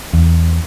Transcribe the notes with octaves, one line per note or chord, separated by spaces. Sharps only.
E2